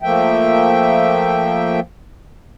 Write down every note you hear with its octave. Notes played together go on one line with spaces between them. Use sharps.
F3 A3 A#3 E5 G5